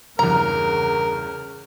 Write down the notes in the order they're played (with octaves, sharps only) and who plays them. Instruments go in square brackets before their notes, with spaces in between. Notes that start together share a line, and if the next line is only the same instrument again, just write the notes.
[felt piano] E2 G2 [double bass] C#3 [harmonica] A#4 [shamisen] A#5